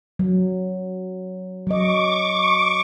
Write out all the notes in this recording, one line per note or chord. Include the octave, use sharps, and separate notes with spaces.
F#3
F#3 D#5 C#6 D6